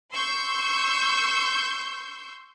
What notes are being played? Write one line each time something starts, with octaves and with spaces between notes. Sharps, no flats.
C6 C#6 E6 G6